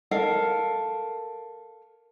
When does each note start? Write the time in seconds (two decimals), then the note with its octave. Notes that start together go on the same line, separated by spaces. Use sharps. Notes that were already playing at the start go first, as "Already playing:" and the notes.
0.11 A4 A#4 F5